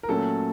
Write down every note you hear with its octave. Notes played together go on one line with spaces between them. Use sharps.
A#4
A#2 F#3 A3 C#4 A4